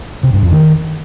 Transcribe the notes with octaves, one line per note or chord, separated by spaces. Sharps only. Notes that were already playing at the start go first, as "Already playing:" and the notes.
C3
G2
F2
D#3